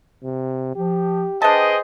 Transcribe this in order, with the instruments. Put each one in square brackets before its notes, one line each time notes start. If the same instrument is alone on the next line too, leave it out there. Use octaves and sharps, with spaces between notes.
[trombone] C3
[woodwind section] F3 [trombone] G4
[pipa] D4 A5 [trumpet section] G#4 C5 D#5 [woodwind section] B4 G5 D#6